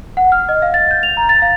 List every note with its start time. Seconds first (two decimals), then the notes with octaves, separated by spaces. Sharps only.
0.17 F#5
0.32 F6
0.49 D#5
0.62 F5
0.74 A6
0.91 G6
1.03 F7
1.17 A#5
1.29 A6
1.42 F5